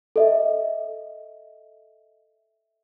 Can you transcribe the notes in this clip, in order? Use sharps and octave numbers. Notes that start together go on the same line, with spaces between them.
A4 D#5 E5